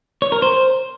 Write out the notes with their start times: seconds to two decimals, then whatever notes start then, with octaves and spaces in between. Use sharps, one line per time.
0.22 C#5
0.32 A#4
0.42 C5